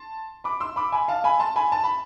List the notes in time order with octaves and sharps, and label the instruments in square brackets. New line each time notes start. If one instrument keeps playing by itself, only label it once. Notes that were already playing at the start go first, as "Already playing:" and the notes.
Already playing: [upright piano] A5 C6
B5 D6
C6 E6
B5 D6
G#5 B5
F5 A5
G#5 B5
A5 C6
G#5 B5
A5
B5